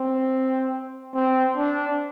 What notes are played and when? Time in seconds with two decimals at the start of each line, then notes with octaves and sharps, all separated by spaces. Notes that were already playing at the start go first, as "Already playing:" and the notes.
Already playing: C4
1.14 C4
1.57 D4